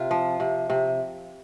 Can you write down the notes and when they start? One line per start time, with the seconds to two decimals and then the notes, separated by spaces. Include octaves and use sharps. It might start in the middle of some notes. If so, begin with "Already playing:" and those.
Already playing: C3 F4
0.11 F3
0.40 C3
0.70 C3